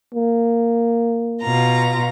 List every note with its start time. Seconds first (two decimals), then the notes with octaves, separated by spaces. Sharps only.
0.15 A#3
1.41 B2 F4 A#5